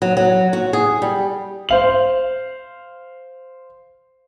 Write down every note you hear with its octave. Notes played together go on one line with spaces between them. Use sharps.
F#3
F#3
F#4
G#4
G3
C5 F5 F#7